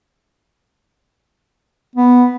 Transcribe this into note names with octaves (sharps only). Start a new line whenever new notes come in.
B3